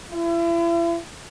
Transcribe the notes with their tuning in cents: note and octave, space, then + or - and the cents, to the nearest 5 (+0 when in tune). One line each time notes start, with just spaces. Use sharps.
E4 +40